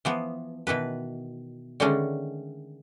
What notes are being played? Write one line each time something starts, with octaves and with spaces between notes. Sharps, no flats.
E3 F3 B3
B2 D#3 E3 B4
D3 D#3 G#3 A3 C#4 D4